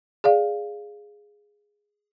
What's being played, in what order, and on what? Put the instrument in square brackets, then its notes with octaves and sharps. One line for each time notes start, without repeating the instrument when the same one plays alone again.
[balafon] G#4 D5 F5